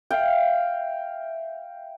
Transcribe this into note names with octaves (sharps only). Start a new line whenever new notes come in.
E5 F5 G5